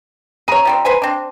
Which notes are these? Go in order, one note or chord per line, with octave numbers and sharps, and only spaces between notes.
G#4 C#5 A#5 D#7
F3 G3 C4
B4 C5 G#5
C4 D4